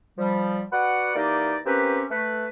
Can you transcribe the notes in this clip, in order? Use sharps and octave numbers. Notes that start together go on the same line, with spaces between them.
F3 G3
F#4 B4 D5 F#5
E3 A#3 D#4 G4 D5
A#3 C4 C#4 G4 B4
A3 B4